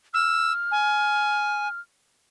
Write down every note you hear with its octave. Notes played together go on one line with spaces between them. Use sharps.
E6 F6
G#5